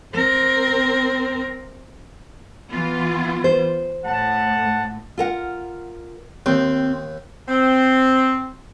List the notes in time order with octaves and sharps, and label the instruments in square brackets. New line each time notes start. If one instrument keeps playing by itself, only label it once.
[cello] C4 A#4
[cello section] E3 B3 F4
[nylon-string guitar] C5
[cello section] A2 [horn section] F#5 A5
[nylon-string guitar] F4 A#4 F#5
[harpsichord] D#2 [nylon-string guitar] C4
[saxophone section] C4